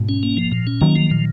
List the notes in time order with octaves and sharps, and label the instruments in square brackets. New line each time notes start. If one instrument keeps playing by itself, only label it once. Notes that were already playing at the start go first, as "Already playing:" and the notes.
Already playing: [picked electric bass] G#2 B2
[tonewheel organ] C#4
A#3
F3
A#2
C#4
[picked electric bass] D#3 F#3 [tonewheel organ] A#3
[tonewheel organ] F3
A#2